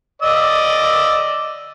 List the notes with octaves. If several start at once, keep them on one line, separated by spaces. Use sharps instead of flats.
D5 D#5 E6